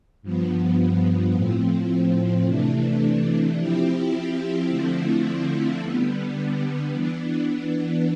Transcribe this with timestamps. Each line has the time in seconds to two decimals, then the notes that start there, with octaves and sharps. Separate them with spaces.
0.22 G2 F3 B3
1.34 A2 F3 C4
2.45 C3 E3 A3 D4
3.57 F3 C4 E4 G4
4.68 D3 F3 A3 C4 E4
5.80 D3 G3 B3
6.92 E3 B3 D4